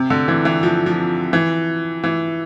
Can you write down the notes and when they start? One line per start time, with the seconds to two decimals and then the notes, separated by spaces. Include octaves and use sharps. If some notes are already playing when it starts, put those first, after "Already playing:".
Already playing: C3
0.10 D3
0.28 E3
0.45 E3
0.63 F3
0.86 F3
1.33 E3
2.04 E3